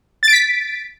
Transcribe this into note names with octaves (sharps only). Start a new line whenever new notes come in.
A6 B6 D7